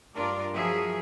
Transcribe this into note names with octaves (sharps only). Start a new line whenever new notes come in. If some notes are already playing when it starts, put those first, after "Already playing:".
G2 D4 F4 A#4 D5
F3 F#3 F#4 G#4 A#4 E5